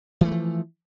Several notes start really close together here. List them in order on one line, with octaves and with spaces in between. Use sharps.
E3 A3 G3 F3